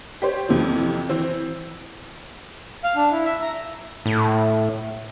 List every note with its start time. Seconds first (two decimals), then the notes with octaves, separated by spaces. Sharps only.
0.22 G4 C5 C#5
0.49 F2 C3 E3
1.09 E3 C4
2.84 F5
2.96 D4
3.12 E4
3.25 E5
3.41 A#5
4.06 A2